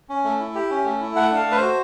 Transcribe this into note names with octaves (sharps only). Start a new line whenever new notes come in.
C#4
A3
E4
G4
C#4
A3
E4
A3 F#5
D4 F5
A3
B4
F#4 C5